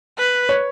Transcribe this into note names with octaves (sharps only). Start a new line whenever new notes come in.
B4
C#5